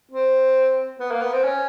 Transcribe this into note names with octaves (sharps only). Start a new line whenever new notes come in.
C4
B3
A#3
B3
C4
C#4